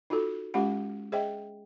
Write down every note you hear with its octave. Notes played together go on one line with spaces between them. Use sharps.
D#4 F4 F#4 A4
G#3 C#4 F4 G4 F#5 B5
G#4 C5 D#5 E5 G5